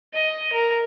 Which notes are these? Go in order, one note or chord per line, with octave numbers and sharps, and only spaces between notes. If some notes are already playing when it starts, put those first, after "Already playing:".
D#5
A#4